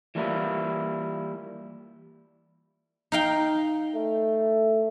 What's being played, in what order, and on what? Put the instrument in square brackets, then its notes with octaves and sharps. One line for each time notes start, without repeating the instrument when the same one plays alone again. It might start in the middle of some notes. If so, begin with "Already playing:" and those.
[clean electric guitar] E3 G3 A#3 E4 F4
[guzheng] D#4 F5 G5
[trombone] A3